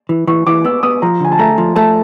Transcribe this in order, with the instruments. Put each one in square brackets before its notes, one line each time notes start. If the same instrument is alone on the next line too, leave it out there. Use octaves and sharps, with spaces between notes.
[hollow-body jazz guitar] E3
[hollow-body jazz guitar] E3 [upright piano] C#6
[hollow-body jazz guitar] E3 [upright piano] D6
[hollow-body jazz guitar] B3 [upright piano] E6
[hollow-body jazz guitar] B3 [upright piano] D#6
[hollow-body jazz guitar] F3 [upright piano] A#5
[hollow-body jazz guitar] D3 [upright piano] G#5
[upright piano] A5
[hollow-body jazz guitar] A3 [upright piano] A#5
[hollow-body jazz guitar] F3
[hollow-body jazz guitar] A3 [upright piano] A5